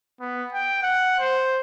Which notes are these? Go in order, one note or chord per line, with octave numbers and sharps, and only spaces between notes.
B3
G5
F#5
C5